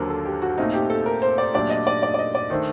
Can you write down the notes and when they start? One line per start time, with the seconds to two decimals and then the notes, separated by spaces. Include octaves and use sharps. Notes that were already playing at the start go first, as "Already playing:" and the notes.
Already playing: D#2 D3 F#3 A#3 A#4 C5
0.10 A4
0.25 G4
0.42 F#4
0.57 A#2 A3 C4 D#4
0.74 G4
0.90 A4
1.06 A#4
1.22 C5
1.38 D5
1.54 A#2 F#3 A3 D4 G4 D5
1.70 D#5
1.87 D5
2.03 D5
2.14 D5
2.19 D#5
2.35 D5
2.50 D#3 A3 D4 A4 C5